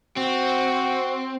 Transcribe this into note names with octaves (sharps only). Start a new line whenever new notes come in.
C4 F#4